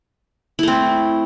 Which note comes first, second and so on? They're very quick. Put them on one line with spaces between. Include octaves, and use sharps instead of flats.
E4 A3 C4